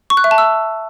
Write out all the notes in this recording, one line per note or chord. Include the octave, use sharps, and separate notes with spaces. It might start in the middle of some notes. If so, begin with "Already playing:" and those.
C#6
F#6
E5
A5
E6